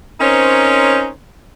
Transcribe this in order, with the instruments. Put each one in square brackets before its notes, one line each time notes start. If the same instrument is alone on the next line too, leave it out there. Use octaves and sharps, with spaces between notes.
[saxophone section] C4 C#4 D#4 A#4 C5 C#5